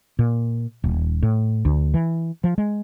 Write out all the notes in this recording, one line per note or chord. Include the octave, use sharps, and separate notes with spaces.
A#2
D#1
A2
D2
E3
F3
G#3